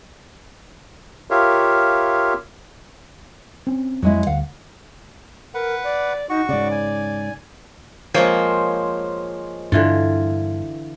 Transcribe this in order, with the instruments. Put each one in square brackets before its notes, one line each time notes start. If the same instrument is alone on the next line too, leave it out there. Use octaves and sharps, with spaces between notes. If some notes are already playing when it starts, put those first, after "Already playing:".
[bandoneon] F4 G4 A#4 C#5 E5 F5
[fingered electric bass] C4 C#4
[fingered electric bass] F2 [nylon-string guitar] F#3 G#3 E4
[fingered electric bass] D2 [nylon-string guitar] F5 F#5
[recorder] A#4 [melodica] B4 F#5
[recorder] D5
[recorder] D#4 [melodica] F#4 C#6
[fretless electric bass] G#2 C#3 [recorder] D5
[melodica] G#5
[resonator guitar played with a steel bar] F3 A#3 [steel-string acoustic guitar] G#3 C5 C#5
[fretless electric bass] G2 D4 [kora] D3 E3 F4